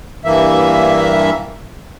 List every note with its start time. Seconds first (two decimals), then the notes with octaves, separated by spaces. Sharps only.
0.25 G2 E3 A#3 E5